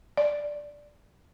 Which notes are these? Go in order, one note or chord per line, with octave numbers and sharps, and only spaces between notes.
D5